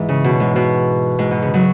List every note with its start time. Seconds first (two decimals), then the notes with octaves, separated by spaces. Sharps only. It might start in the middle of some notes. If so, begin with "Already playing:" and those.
Already playing: G#2 E3
0.09 C#3
0.24 B2
0.40 G#2
0.56 B2
1.19 G#2
1.31 B2
1.42 C#3
1.54 C#3 F#3